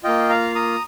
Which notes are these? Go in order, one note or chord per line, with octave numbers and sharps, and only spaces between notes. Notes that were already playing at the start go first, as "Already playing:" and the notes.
A#3 F4 D#5 G5
F5 A#5
A#5 D#6